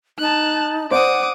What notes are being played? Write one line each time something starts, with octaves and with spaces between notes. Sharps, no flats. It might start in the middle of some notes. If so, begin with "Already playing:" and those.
D#4 A5 F#6
C5 D5 F#5 D6 D#6